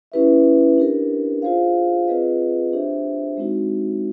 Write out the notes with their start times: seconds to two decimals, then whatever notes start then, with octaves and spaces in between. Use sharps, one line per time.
0.12 C#4 E4 G4 B4 E5
0.78 D4 G4 A#4
1.42 F4 G#4 C5 F5
2.08 C4 F4 G#4 B4 D#5
2.73 D4 G4 C5 E5
3.37 G#3 C4 D#4 F#4